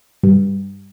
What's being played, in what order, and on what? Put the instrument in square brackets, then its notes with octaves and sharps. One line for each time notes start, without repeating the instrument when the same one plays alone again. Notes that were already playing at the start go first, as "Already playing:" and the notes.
[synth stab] G2